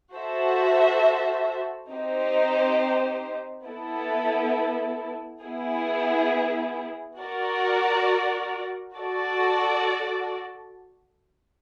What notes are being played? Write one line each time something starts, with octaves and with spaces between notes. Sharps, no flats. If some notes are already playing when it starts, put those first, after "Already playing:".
F#4 A4 C5 E5
C4 D#4 G4 C5
B3 E4 A4
B3 E4 G#4
F#4 A#4 D5
F#4 A4 D5